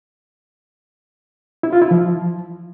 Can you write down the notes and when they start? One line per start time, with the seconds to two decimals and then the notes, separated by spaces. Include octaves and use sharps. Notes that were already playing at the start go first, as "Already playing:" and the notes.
1.63 E4
1.73 F4
1.82 E4
1.91 F3